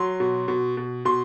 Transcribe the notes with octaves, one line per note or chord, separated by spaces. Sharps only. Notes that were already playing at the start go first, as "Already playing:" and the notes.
Already playing: F#3 C6
B2
B2
B2
B2 C6